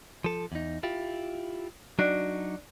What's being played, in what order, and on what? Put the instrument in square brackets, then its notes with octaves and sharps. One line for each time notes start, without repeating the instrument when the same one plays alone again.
[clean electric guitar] F3 A4
E2 D#4
E4 F4 G4
[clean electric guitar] F#3 D#4 F#4 [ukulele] D4